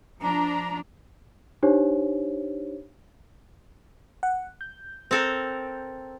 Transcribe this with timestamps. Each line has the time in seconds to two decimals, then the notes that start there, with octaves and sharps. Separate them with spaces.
0.21 F3 D4 A#5
1.63 D4 D#4 G4 C5 C#5
4.23 F#5
4.61 G6
5.11 C4 A4 A#4